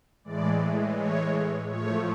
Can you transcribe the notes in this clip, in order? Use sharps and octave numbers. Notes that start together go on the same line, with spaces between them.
A2 E3 G#3 D5
C#5
A2 F3 A3 C#5